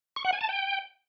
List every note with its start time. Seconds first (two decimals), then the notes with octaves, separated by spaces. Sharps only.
0.16 C#6
0.25 F#5
0.33 G#5
0.41 A5
0.49 G5